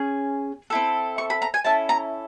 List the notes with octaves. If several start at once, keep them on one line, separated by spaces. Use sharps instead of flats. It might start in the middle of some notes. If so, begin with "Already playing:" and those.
Already playing: C#4 G#4
C4 E4 A4
C#6
B5
A#5
G#5
C#4 E4 A4 A5
A#5